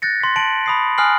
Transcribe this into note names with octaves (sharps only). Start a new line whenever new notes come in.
F#6 G6 A6 A#6 C#7
C6 B6
A5 C#7 D7 F#7
B5 D#6 C7
G#5 D#6 F6 F#6 C7 F#7